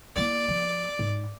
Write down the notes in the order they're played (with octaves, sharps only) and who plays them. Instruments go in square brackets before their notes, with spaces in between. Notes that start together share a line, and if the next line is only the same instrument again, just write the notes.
[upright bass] A#3 E4 [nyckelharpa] D5
[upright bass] F3
G#2